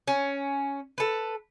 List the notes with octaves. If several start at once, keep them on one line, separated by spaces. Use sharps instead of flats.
C#4
A4 B4